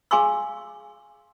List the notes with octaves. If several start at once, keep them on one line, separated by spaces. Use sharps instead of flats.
G#4 F5 G#5 C6 C#6 E6